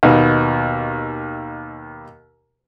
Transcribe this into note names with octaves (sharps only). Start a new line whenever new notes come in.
D#2 B2